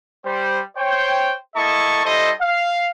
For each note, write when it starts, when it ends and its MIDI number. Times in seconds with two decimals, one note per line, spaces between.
0.25 0.60 55
0.25 0.60 72
0.77 1.33 72
0.77 1.33 73
0.77 1.33 79
1.56 2.04 58
1.56 2.04 64
1.56 2.04 69
1.56 2.04 75
1.56 2.04 81
1.56 2.04 85
2.05 2.31 55
2.05 2.31 64
2.05 2.31 69
2.05 2.31 72
2.05 2.31 75
2.41 2.91 77